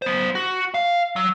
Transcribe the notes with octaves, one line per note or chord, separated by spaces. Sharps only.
B3 C5
F#4
F5
F#3